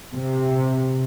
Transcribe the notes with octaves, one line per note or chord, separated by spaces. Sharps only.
C3